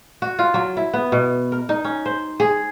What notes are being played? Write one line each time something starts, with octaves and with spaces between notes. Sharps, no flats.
F#4
F4
F#3
E4
B3
B2
A#4
D#4
C#4
C5
G#4